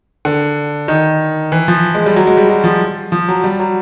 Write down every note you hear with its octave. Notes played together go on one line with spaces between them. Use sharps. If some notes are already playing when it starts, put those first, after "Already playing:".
D3
D#3
E3
F3
G#3
G3
F#3
G#3
G3
F#3
F3
F3
F#3
G3
F#3